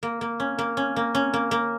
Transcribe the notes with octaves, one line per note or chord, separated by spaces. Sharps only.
A#3
A#3
C#4
A#3
C#4
A#3
C#4
A#3
A#3